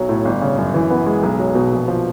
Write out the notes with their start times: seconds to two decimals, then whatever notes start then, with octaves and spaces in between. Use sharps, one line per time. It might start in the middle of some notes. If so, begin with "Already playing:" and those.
Already playing: B1 F#3
0.09 A2
0.25 G1
0.42 C#3
0.58 F#2
0.74 E3
0.90 B3
1.06 G#3
1.23 B1
1.39 F#3
1.55 B2
1.72 A#1
1.88 F3